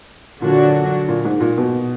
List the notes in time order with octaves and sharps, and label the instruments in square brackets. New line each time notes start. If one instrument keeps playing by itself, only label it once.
[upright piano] A#2 [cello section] D3 F#3 D4 F#4
[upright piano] A#2
G#2
A#2
B2